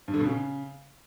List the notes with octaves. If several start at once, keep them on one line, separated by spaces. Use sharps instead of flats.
G2
D3
B2
C#3